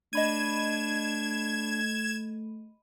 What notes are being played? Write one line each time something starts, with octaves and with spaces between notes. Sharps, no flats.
A3 D4 D#5 B5 G#6 D#7 E7